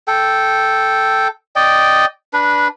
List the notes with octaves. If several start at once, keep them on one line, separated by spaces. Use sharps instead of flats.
A4 G5
D5 D#5 G5
D4 B4